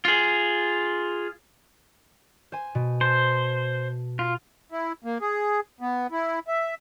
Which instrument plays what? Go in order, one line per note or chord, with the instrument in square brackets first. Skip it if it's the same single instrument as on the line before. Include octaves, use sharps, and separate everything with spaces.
[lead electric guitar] F4 G#4
[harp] C5 G#5
B2
[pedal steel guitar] C5 [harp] A5
[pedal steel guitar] F4
[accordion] E4
A#3
G#4
B3
E4
E5